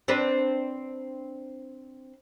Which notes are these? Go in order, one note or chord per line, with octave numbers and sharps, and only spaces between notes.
C4 D4 B4